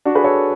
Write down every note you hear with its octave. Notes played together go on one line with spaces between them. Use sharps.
D4 F#4
G#4 B4
A4 C#5